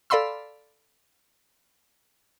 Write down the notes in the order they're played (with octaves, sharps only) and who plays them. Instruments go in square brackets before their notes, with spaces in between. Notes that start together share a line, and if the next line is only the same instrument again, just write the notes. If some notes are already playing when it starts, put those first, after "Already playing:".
[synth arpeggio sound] A4 D5 F5 B5 C6 E6